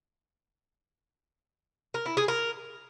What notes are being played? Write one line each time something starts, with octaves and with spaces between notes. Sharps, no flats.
A#4
E4
G#4
A#4